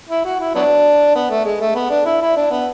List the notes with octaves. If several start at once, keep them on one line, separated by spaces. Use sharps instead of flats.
E4
F#4
E4
F#3 B3 D4
B3
A3
G#3
A3
B3
D4
E4
E4
D4
B3